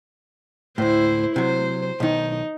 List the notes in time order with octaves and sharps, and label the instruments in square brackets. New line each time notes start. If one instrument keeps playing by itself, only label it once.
[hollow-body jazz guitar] D2 A2 [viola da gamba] E4 C5
[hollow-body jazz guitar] C3 F#3 [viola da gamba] C5
[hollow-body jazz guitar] B1 D#3 [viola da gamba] D#4